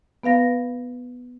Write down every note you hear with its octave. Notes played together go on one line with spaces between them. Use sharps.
B3 B4 F5 A#6